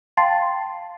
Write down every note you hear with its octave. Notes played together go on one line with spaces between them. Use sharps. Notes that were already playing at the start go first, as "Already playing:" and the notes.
F5 G5 A5 C6 A6 C7